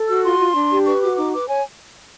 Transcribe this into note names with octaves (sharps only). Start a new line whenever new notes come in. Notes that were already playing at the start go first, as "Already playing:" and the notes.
Already playing: A4
F#4 E6
F4 C6
F4
D4
G4
B4 C#6
F#4 D6
D#4 D6
B4 D6
C#5 G#5